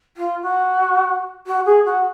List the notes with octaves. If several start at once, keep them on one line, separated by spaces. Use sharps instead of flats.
F4
F#4
F#4
G#4
F#4